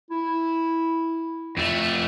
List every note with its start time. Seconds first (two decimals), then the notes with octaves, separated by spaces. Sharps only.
0.10 E4
1.57 F2 A3